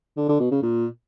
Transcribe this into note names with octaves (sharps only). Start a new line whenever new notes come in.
D3
D3
B2
C#3
A#2